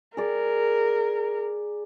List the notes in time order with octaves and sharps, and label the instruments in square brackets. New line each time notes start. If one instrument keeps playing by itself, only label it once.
[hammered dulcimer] G#4 D5 [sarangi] A#4